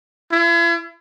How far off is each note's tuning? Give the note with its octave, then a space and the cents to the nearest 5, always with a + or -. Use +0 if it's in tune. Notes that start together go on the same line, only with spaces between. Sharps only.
E4 +45